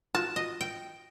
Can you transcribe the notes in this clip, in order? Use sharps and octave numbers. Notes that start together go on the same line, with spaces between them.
F4 F#4 A5
D#5
G5